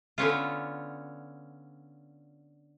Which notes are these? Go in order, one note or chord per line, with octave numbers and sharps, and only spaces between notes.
D3 B3 C#4 F4